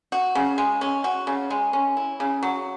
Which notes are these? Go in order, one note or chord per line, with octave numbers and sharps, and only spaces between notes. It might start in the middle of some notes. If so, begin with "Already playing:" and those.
F#4
C#3
G#3
C#4
F#4
C#3
G#3
C#4
E4
C#3
F#3